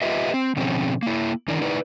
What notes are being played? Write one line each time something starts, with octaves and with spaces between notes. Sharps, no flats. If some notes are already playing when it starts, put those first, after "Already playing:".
F4 G4 B4 D#5 E5
C4
B2 D3 F3 C4 C#4
A#3 E4
D#3 E3 D4 E4 A#4 D5
D#4 E4 B4 D5